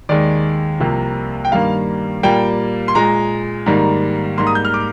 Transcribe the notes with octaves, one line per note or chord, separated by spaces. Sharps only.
D#2 D#3 G#3 D5
C2 C3 F3 A#3
G5
G2 D#3 G3 A#3 F5
A#2 G3 A#3 G5
C6
A#2 G#3 A#5
G#2 D#3 G3 A#3
G#2 G3 A#3 C6
D#6
G6
F6
D6